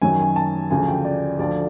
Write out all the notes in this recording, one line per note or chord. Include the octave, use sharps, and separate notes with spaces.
F#2 D#3 F#3 G#5
G#5
A5
D2 C#3 F3 G#5
G5
D5
D2 D3 F3 D5